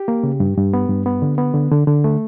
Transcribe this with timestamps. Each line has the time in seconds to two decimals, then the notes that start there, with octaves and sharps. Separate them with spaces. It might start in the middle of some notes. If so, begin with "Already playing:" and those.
Already playing: G4
0.08 A#3
0.23 C#3
0.40 G2
0.57 G2
0.74 B3
0.89 G2
1.06 B3
1.22 D3
1.38 B3
1.54 D3
1.71 D3
1.87 D3
2.04 A3